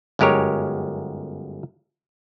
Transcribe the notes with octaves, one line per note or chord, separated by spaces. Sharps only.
G1 F#2 G#3 G4 A#4 C#5